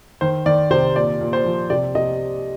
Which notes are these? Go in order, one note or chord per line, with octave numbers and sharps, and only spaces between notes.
D#3 C5
D#3 D5
C3 C5
A#2 D5
A#2
C5
F3
C3 D5
C3 D#5